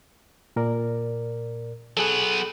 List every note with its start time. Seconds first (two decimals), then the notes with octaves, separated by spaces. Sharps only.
0.56 A#2 A#4 D5
1.97 F#3 B3 G#4 A4